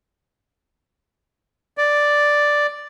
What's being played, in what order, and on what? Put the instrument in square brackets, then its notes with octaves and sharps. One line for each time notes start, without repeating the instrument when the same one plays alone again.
[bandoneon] D5